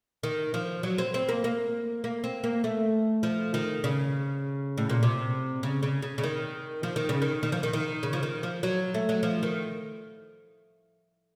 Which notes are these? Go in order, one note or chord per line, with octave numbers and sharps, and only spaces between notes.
D#3
F3
F#3
C4
C4
A#3
A#3
A#3
C4
A#3
A3
F3
D#3
C#3
A2
A#2
C3
C#3
C#3
C#3
C#3
D#3
F3
D#3
C#3
D#3
D#3
F3
D#3
D#3
C#3
F3
D#3
F3
F#3
A3
F#3
F3
D#3